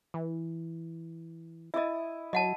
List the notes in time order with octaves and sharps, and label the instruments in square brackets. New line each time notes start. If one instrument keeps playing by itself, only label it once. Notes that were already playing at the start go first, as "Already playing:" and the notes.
[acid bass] E3
[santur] E4 D#6 [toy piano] D#5 E5
[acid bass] F#3 [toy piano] D#5 F#5 A5